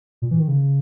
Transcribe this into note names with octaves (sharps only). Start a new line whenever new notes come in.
A#2
E3
D#3
C#3